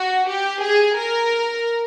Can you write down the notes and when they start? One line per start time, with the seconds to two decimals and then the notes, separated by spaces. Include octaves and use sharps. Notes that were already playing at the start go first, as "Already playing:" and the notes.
Already playing: F#4
0.28 G4
0.62 G#4
0.96 A#4